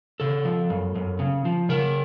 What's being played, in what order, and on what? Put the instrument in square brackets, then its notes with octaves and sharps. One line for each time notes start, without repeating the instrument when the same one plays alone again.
[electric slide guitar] C#3 A4
F3
F#2
F#2
C#3
F3
C#3 A#4